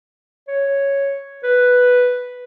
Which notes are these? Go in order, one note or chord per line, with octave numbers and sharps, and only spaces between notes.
C#5
B4